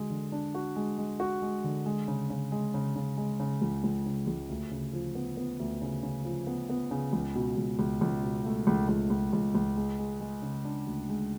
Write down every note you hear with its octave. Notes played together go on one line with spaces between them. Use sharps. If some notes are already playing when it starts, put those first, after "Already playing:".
Already playing: D3 G#3 F#4
D3
D4
F#4
G#3
G#3
F#4
G#3
D3
G#3
C#3
C#3
G#3
C#3
C#3
G#3
C#3
C#2
C#2
C#3
C#2
D2
C#3
F3
B3
B3
D2
C#3
C#3
F3
B3
B3
C#3
C#2
B2
C#2
C#2
C#2
B2
A3
C#2
C#2
C#2
C#2
C#2
G#3
G#3
G#3
C#3
D4
D2
G#3